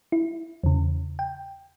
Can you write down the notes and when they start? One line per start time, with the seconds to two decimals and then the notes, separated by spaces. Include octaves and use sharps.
0.12 E4
0.64 E2 C#3
1.19 G5